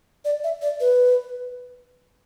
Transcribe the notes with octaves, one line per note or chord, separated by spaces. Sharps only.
D5
E5
D5
B4